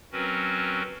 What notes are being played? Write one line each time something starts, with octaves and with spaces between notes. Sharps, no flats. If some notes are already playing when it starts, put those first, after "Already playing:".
F#3 C4 C#4 F#4 A#4 B4